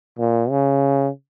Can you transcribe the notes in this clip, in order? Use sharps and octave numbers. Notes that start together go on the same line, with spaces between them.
A#2
C#3